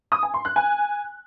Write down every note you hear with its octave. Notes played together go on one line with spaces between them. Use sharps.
D#6
G#5
C6
F#6
G#5